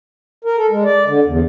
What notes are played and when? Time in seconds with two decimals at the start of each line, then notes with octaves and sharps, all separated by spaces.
0.45 A#4
0.58 A4
0.71 G#3
0.84 D5
1.06 D3
1.25 E2